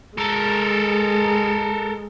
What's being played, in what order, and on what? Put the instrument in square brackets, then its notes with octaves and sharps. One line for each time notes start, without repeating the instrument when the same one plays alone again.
[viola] G#3 [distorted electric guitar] A4 A#4